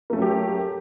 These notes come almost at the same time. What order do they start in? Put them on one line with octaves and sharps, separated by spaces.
A#3 A3 C#4 F#3 G4